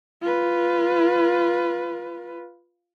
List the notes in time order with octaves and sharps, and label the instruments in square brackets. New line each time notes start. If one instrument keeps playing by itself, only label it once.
[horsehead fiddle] F4 B4